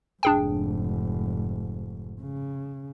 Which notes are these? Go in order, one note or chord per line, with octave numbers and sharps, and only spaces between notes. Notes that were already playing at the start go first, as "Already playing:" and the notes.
F1 G#2 D4 G#4 G5
C#3